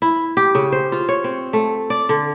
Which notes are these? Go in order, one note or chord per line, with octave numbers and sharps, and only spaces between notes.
E4
G4
C#3
C5
F4
C#5
C4
A3
D5
D3